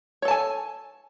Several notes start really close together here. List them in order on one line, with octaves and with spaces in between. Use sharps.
C#5 A4 A5 G#5